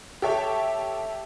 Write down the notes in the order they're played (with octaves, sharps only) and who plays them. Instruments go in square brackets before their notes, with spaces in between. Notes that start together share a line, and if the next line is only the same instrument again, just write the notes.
[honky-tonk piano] G4 A4 C#5 E5 G5 A5